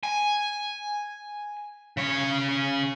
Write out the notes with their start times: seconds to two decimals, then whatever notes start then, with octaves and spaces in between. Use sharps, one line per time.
0.03 G#5
1.97 C#3 C#5